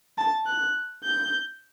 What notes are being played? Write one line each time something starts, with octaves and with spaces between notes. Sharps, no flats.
A5
F#6
G6